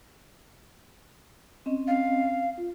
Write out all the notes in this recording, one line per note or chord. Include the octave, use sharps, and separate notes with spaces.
C4 C#4 D#5
F5
F4